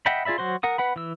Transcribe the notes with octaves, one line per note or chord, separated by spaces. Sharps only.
D#5 E5 F#5 G5 B5
F4 G#4 D5 E5 B5
F#3 F#4 C5 C6
A#4 F#5 D#6
B4 F#5 B5
E3 E6